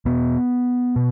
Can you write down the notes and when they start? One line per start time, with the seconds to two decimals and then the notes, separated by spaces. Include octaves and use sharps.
0.05 E2 B2 B3
0.96 B2